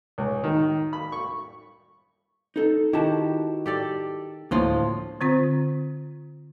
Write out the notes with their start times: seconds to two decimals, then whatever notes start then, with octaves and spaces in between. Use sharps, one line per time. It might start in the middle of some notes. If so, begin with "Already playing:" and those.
0.18 C#2
0.44 D#3
0.93 B5
1.12 C#6
2.56 D#4 A4
2.93 D#3 E4 F#4 G4 A5
3.66 G4 A4 D5
4.51 D2 A2 F3 A#3 D#5
5.21 D3 C4 F4 C5